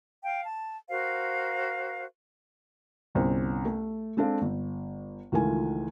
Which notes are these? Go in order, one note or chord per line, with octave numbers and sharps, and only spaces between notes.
F5 G5
A5
F#4 A#4 C5 F5
G1 C2 C#4 C5
A3
G#3 C4 D4 A4 F5
G1
C#2 D#3 E3 A3 F4 G#5